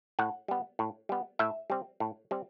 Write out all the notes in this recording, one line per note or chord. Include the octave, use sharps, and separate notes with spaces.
A2 F#5
G3 B3
A2
G3 B3
A2 E5
G3 C4
A2
G3 C4